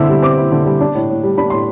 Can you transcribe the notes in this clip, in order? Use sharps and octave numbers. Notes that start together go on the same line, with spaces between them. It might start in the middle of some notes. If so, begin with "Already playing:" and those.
Already playing: D3 C4 E4 E6
G3
C4 D6
E4
D3
G3
D4
A2
A2
G3
D4 B5
A2 C6